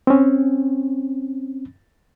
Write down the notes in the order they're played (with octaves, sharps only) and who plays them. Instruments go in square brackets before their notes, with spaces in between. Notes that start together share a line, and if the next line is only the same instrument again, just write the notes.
[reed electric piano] C4 C#4